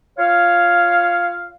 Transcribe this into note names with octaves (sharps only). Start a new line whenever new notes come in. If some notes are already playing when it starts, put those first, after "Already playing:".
F4 C#5 F5